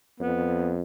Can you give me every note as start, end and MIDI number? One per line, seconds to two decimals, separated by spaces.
0.20 0.82 41
0.20 0.74 59